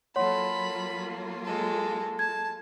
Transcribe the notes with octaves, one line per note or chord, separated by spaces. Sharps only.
F#3 A#3 F4 A4 C#5 F#5 B5 C6
G#3 A4
A5 G#6